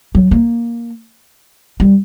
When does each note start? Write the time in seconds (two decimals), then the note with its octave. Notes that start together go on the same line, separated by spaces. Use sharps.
0.15 F#3
0.31 A#3
1.80 G3